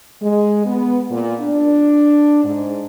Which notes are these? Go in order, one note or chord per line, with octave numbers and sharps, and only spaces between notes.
G#3
B3
A#2
D4
G#2